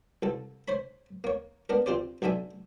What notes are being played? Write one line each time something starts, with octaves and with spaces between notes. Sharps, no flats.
C2 A4
C5 C#5 B5
A#3 C#5
B3 D4 A#4
C4 F4 G4 C5 D5
B1 D3 D4 E5 G#5